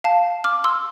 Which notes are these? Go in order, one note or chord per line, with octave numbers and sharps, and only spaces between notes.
F5 A5
D6 F6
C6 E6